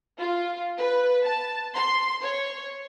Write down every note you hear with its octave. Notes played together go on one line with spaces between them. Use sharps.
F4
B4
A5
C6
C#5